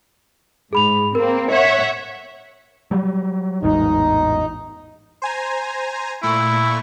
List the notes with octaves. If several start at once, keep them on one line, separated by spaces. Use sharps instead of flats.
G#2 G#4 B5 F7
A#3 C4 A#4
C#5 E5 F#5
F#3 G3
A1 E2 G#2 D#4
C5 G#5 A#5
A#2 A3 E4 C#6